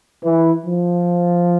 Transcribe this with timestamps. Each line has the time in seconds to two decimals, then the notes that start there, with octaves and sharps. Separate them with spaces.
0.22 E3
0.65 F3